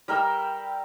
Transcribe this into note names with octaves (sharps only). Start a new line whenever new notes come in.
G3 A#4 G5 E6